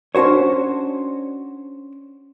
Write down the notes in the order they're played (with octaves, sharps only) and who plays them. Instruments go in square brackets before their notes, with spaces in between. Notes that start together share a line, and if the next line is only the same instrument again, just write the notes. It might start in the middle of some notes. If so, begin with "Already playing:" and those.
[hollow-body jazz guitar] C#4 D4 F#4 C5 C#5